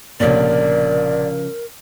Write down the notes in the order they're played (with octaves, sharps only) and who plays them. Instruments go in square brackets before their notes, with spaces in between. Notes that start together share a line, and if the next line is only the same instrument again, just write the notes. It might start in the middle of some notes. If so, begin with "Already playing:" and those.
[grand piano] F1 A#2 [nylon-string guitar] C#3 F3 D4 [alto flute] A#4 [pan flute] D5